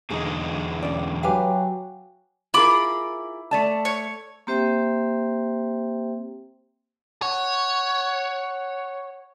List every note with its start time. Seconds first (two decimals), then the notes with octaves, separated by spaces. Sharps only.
0.10 E2 D3 G#3 D#4 G#4
0.82 C#4 D5
1.23 F#3 G4 B4 F5 G5 G#5
2.54 E4 F4 G#4 A#4 B5 D6
3.51 A3 D5 A5
3.85 C#5
4.47 A#3 C4 G4 C5 E5 G5
7.22 C#5 F#5